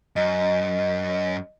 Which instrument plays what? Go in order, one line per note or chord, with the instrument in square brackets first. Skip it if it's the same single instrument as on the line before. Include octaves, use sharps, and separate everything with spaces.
[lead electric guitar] F#2 [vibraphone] D#5